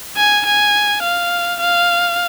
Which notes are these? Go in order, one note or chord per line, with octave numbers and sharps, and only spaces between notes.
G#5
G#5
F5
F5